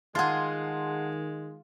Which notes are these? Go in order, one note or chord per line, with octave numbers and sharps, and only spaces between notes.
D#3 G#3 F4 G#4 F#5 A5 C6